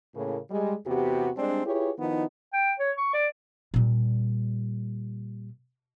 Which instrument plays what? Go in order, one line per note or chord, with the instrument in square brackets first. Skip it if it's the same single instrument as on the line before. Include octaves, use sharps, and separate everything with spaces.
[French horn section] A2 C#3 A#3
G3 G#3
E2 C3 B3 F#4 G4
G3 G#3 C4 D4
E4 F4 G4 G#4 B4 C#5
D#3 F3 B3 D#4 E4
[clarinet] G5
C#5
C#6
D5
[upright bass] A#2 G3